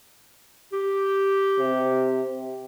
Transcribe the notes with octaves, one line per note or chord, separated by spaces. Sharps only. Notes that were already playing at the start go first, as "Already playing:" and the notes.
G4
C3